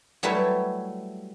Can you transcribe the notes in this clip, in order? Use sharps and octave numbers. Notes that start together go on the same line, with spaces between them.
F#3 G3 A3 E4 B4 C#5